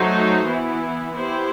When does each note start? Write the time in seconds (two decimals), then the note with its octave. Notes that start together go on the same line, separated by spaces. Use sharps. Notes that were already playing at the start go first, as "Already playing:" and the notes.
Already playing: F#3 A3 D#4 F#4 C5
0.47 E3 B3 E4
1.13 B3 E4 G4 C5